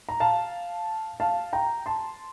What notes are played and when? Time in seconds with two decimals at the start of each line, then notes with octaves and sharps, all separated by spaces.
0.09 A#5
0.20 F5 A5
1.20 F5 A5
1.53 G5 A#5
1.86 A5 C6